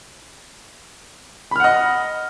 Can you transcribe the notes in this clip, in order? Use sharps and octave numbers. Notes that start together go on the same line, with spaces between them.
D#5 F#5 B5 F6